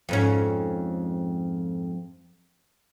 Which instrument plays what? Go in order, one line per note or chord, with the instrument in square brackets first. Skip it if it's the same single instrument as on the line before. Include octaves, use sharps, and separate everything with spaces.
[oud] F2 G#2 C#4